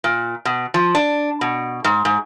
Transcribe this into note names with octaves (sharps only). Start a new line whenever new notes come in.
A#2
B2
F3
D4
B2
G#2
G#2